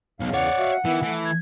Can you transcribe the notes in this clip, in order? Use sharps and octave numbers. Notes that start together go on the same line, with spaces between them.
B1 E2 C#3 F5
C#5 D5 F#5
F#4 E5 F5
D#3 E3 B3 E4
E3 A3
G#6